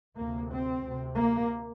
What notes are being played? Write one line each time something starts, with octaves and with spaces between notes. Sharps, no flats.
D2 C3 A#3
C4
D2 C3
A#3